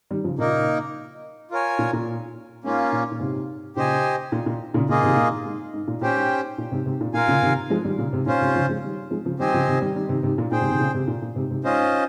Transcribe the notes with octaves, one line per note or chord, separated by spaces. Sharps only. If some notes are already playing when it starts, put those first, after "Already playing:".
D#3 G3
C#3 F3
A#2 C#3 A#3 D#4 A#4
F4 A#4 C#5 G#5
A#2
A#2
G#2 A#3 C#4 F4
A#2
A#2
G#2 C3
A#2 C#3 G4 C5 D#5 G#5
A#2
A#2
A#2 C#3
A#2 C#3 A#3 F4 G#4 D#5
C3 D#3
A#2
G#2
G#2
A#2
A#2 C#4 G4 C5 G5
G#2
A#2
G#2 C3
G#2 C3
A#2
A#2 F4 A#4 F5 G#5
A#2 C#3
C3 D#3
F3 G#3
D#3 G3
A#2 C#3
G#2 C3
A#2 C#4 F4 C5
G#2 C3
C#3 F3
F3 G#3
D#3 G3
F3 G#3
C#3 F3
D#3 G3 C4 G4 C5 D#5 G#5
C#3 F3
C3 D#3
D#3 G3
D#3 G3
C3 D#3
G#2 C3
A#2
A#2 G#4 C5 G5
G#2 C3
C3 D#3
A#2 C#3
G#2 C3
A#2
A#2
G#2 C3
G#2 C3
G#2 C#4 F4 C5 D#5